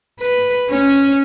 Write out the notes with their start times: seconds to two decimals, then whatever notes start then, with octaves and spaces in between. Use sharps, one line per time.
0.21 B4
0.70 C#4